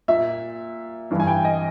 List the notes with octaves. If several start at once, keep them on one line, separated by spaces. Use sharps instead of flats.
A#2 E5
G2 E3
G#5
G5
D#5